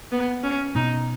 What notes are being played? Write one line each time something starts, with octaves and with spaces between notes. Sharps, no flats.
B3
C#4
B2 B3 D#4